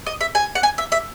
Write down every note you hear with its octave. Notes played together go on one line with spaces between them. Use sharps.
D#5
E5
G#5
F#5
G#5
E5
E5